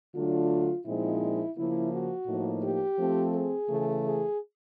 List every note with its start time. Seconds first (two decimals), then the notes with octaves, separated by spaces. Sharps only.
0.15 D3 F#3 A3 D4 F4
0.86 A#2 F3 G#3 C4 D#4 E4
1.57 C#3 F3 A#3 E4
1.92 F#4
2.27 A2 F3 A#3 D#4
2.63 G4
2.98 F3 A3 C4
3.34 G#4
3.69 C#3 E3 A3
4.05 G#4